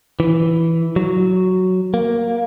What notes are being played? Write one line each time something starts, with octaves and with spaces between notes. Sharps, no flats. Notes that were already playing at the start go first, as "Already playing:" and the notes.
E3
F#3
A#3